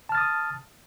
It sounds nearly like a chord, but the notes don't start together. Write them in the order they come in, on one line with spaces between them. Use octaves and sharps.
A5 F6 A6 D#6